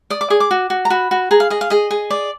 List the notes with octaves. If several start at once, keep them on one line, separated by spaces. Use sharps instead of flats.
D5 D#6
D6
G#4 D#6
D6
F#4
F#4
A#5
F#4 B5
F#4
G#4 A#5
F5
G#4 D#5
F5
G#4 D#5
G#4
D5